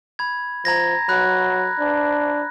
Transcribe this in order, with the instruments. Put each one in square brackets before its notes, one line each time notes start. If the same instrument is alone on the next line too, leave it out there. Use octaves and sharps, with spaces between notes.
[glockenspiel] B5 G#6
[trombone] F3 [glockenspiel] A#5 G#6 A#6
[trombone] F#3 [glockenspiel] B5 F#6
[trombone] D4